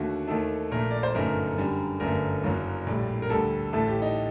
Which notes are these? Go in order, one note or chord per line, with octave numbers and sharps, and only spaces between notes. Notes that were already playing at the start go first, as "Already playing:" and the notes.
Already playing: D#2 D3 A3 F#4
D#2 D#3 A3 A4
A#1 A#2 A3 A#4
D5
C5
G1 F#2 D#3 A3 A#4
F#2 D3 G3
G1 F#2 D3 A3 A#4
F#1 F#2 F#3
A#1 A2 G3
A#4
D2 D3 G3 A4
A1 A2 A3 A4
G4
D#4